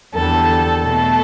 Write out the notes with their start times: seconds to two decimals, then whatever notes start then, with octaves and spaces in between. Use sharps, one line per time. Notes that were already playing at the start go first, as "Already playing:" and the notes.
0.14 E2 D3 G3 A4
0.82 B2 A3 A4